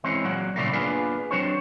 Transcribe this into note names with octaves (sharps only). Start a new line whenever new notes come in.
E3 G#3 C4 C#4
A#2 F#3 F#5
A#2 C#3 E3 G3 A3 A#3
A#3 B3 D4 F4 G#4 B4
F#3 C4 D4 C5 C#5